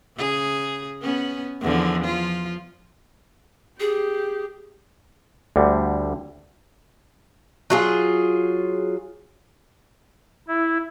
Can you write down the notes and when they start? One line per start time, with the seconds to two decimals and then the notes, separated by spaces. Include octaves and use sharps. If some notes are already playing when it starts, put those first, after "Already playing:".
0.17 C#3 G#4
1.02 B3 C#4
1.61 E2 D3 F3
2.04 F3 F4
3.80 G4 G#4
5.56 D2 D3 G3
7.70 F#3 F4 G#4
10.48 E4